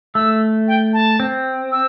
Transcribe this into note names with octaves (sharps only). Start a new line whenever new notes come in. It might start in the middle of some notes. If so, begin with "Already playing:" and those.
A3 E6
G5
A5
C4
E6